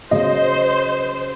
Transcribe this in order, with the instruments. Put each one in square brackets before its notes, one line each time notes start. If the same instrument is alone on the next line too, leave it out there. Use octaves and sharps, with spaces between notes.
[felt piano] C#3 F#3 [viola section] C5 [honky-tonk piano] D#5